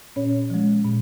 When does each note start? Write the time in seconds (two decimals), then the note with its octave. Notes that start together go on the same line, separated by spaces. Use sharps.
0.16 A#2 C#4 C#5
0.50 F3 G#3
0.85 A#2